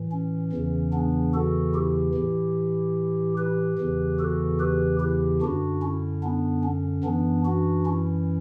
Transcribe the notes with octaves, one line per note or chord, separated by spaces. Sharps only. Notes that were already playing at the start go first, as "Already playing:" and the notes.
Already playing: A2 E3
C#4
E2 C#3 E3
B3 D4
F#4 A4
E4 G4
A2 E3
G4 B4
E2 C#3 E3
F#4 A4
G4 B4
E4 G4
F#2 D3 D4 F#4
C#4 E4
B3 D4
C#4
F#2 E3 B3 D4
D4 F#4
C#4 E4